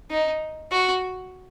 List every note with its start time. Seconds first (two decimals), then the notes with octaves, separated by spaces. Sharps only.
0.10 D#4
0.72 F#4